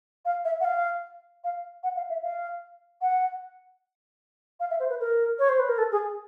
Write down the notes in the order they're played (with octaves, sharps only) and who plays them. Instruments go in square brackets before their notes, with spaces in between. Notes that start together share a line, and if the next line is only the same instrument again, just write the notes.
[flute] F5
E5
F#5
F5
F5
F#5
F5
E5
F5
F#5
F5
E5
C5
B4
A#4
C#5
C5
B4
A#4
A4
G#4